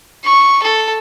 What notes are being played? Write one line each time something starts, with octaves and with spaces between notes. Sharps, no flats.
C#6
A4